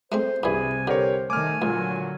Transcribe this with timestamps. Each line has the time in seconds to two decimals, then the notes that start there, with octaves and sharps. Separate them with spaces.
0.12 G#3 A3 C4 C5
0.43 C2 G2 C3 E3 G#4 G#5 B5
0.87 D3 G4 A#4 C5 C#5
1.30 D#3 A3 G#5 D6 F6
1.62 C#2 A#2 D3 F#3